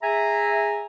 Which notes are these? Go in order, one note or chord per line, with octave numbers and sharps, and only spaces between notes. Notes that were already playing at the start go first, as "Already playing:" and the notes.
G#4 E5 G#5 A#5